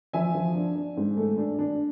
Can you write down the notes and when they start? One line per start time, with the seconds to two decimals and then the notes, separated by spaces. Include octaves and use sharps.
0.13 F3 E5 G#5
0.34 F3
0.55 D4
0.75 D4
0.97 G#2
1.17 A3
1.38 D4
1.59 D4